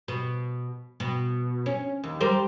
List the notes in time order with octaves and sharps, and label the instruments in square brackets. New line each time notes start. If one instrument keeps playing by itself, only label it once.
[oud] B2
B2
C#4
D#2
G3 A#4 C5